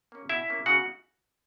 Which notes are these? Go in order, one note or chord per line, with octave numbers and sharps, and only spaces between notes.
A#3 C#4
B2 E4 E5
A#3 C#4
C#3 F#4 F#5